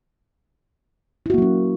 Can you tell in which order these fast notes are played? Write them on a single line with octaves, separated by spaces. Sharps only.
E4 F#4 A#3 F#3 C#4